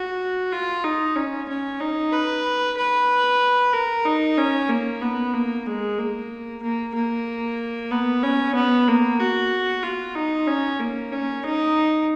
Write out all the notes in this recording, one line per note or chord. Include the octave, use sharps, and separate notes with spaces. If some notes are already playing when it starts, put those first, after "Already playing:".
Already playing: F#4
F4
D#4
C#4
C#4
D#4
B4
B4
A#4
D#4
C#4
A#3
B3
A#3
G#3
A#3
A#3
A#3
B3
C#4
B3
A#3
F#4
F4
D#4
C#4
A#3
C#4
D#4